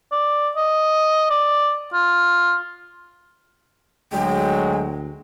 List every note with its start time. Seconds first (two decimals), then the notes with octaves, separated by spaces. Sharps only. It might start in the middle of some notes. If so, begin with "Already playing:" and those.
0.12 D5
0.56 D#5
1.30 D5
1.93 F4
4.12 D2 F#3 G#3 G5